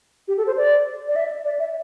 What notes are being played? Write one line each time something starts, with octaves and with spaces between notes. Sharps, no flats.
G4
A4
C5
D5
D5
E5
D5
E5